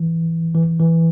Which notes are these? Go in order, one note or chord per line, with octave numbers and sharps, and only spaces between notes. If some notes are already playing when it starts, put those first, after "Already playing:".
Already playing: E3
E3
E3